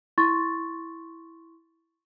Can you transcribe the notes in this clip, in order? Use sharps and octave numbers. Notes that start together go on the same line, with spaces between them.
E4 C6 C#6 A6